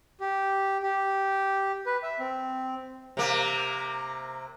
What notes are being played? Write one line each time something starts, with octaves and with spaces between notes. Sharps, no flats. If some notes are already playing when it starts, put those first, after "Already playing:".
G4
G4
B4
E5
C4
C3 A#3